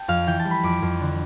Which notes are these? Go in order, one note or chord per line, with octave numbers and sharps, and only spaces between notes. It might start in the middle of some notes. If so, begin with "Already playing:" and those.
Already playing: G5 A5
F2 F5
E3 G5
A5
G3
B5
F2 D6
F2
D3